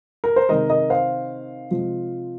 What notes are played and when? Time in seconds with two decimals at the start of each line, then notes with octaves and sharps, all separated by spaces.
0.24 A#4
0.36 C5
0.49 C3 D#3 G#3 A#4 D#5
0.70 A#4 D#5
0.90 C5 F5
1.71 C3 F3 G#3